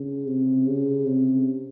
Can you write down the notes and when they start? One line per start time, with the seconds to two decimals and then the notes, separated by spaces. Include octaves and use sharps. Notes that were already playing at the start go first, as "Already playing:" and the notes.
Already playing: C#3
0.27 C3
0.66 C#3
1.06 C3